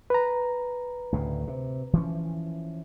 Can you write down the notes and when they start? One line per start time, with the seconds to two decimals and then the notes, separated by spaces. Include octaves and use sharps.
0.10 B4 A#5
1.12 D2 A2 C#3
1.47 C3
1.93 E3 F3 C#4